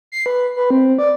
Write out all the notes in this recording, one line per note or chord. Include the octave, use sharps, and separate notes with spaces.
C7
B4
B4
C4
D5